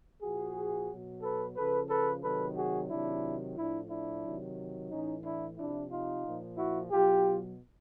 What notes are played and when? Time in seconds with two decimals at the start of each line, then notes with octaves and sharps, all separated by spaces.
0.22 A#2 F3 F#4 G#4
0.89 B2 F#3
1.22 A4 B4
1.56 C#3 F3 A4 B4
1.90 A4 B4
2.23 C3 D#3 F#3 A4 B4
2.57 F#4 G#4
2.90 C3 D#3 F#3 D4 E4
3.56 A2 F3 D4 E4
3.90 D4 E4
4.24 C3 D#3 F#3
4.91 A2 E3 C#4 D#4
5.24 D4 E4
5.57 C3 F3 D4 E4
5.91 D#4 F4
6.25 A#2 F3
6.57 E4 F#4
6.91 B2 F#3 F4 G4